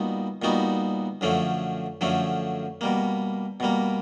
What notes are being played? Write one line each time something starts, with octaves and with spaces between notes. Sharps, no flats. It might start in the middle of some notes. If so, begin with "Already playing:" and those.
Already playing: A#2 G3 B3 D#4 F#4
A#2 G3 B3 D#4 F#4
F#2 D3 F3 A3 C#4
F#2 D3 F3 A3 C#4
B2 G3 A#3
B2 G3 A#3